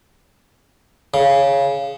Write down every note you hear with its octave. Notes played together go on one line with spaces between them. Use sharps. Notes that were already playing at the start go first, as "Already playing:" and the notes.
C#3